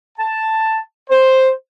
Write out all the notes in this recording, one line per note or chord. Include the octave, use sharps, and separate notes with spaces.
A5
C5